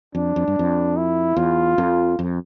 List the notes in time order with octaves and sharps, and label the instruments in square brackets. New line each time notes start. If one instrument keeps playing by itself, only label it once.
[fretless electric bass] F2 [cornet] D4
[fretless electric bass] F2
G2
F2
[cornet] E4
[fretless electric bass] E2 [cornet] F4
[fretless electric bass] F2
F2